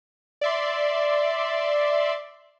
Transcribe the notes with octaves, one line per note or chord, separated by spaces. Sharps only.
D5 E5 C6